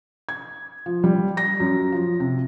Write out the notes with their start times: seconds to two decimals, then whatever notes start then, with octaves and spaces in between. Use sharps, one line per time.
0.29 G#6
0.86 F3
1.04 G3
1.37 A#6
1.60 F#2
1.92 F3
2.20 C3